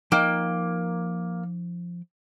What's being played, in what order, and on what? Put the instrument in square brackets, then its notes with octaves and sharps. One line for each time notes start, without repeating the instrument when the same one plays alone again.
[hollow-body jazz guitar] F3 D#4 G5 [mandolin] A#3